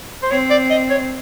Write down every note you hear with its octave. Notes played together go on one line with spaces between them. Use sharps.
C5
C4 C#5
D5
D#5
C#5